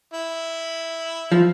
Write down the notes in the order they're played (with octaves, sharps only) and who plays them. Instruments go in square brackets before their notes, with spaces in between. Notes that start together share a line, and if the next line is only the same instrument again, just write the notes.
[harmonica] E4
[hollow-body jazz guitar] F3